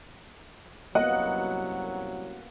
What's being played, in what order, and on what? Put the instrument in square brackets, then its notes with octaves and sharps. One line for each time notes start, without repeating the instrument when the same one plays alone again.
[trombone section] C2 F#2 F#3 [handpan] A#3 B3 [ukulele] D#5 [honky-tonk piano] F#5